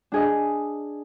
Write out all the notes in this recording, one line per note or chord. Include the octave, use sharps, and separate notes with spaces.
D4 G#4 D#5